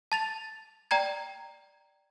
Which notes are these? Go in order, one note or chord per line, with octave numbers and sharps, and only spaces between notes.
A5 A6 F7
D5 G5 A#5 G#6